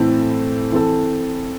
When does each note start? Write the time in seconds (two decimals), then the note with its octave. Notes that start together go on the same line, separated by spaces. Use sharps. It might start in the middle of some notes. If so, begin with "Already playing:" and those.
Already playing: A2 E3 A3 C4 A4
0.72 E3 C4 A4